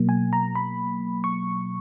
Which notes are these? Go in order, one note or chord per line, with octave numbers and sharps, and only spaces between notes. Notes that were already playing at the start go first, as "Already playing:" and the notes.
Already playing: B2 F#3 A#3
G#5
A#5
B5
C#6